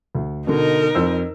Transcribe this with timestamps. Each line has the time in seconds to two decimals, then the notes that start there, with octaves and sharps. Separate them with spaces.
0.15 D2
0.47 B2 D3 D#4 A#4
0.95 F2 C5 E6